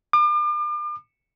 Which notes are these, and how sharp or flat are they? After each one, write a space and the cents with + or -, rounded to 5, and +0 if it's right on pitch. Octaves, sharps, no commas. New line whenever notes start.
D6 +40